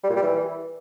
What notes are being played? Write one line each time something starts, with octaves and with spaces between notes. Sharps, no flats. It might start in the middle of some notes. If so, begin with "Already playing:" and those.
G3
A#2
G3
E3